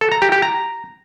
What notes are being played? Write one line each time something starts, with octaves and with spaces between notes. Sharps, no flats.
A4
A#5
G4
G4
A#5